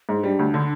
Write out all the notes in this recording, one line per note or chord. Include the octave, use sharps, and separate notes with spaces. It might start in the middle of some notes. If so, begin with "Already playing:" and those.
G#2
D#4
G3 D4
D2
D3